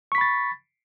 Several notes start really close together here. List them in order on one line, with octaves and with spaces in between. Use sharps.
C#6 B6 B5 A6